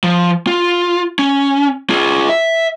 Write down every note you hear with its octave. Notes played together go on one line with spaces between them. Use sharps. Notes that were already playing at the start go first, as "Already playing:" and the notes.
F3
F4
C#4
F4 G#4
E5